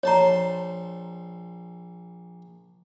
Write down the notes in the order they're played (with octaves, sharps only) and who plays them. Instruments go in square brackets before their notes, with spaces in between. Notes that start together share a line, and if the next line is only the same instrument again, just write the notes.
[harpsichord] A#1 A5 C6 [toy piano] C#5 A#5